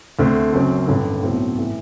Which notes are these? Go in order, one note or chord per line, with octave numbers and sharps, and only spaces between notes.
D2 D3 A3 C4
F#1 F#2 F#3 C4
A1 G2 D3
B1 A2 F#3 C4
A2 E3